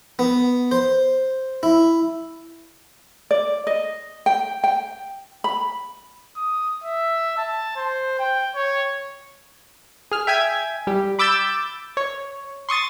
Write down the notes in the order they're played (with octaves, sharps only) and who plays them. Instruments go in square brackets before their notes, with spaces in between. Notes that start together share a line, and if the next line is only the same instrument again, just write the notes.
[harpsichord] B3
C5
E4
[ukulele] D5
D#5
G5
G5
B5
[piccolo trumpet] D#6
E5
A5
C5
G5
C#5
[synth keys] G#4 F6
E5 G5 G#5 G#6 B6
G3 G4
B5 D6 E6 G6 A6
C#5
C6 C#6 D#6 A6